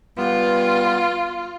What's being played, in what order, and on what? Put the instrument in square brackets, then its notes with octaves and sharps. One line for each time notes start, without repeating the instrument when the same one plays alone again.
[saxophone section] G3 B3 [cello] F4